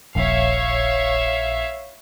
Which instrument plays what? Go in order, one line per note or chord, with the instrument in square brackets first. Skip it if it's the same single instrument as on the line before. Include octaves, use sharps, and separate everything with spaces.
[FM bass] D#1 [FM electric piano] A#1 [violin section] C#5 E5 F5